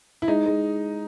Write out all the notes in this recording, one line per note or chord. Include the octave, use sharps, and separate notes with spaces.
E4
G#3 D#4
G#3